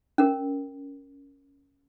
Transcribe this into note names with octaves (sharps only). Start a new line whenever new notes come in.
C#4 A#4